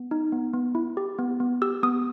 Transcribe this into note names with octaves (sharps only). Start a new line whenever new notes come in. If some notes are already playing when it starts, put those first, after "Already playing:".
Already playing: B3
D#4
B3
B3
E4
G4
B3
B3
G4 E6
B3 D#6